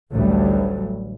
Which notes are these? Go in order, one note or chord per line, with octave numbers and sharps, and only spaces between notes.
A1 D2 E3 F#3 G3 A3